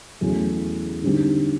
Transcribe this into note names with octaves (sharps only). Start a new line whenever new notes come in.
E2 C#3 F#3 A3 C#4
D3 G3 C4 D#4 G4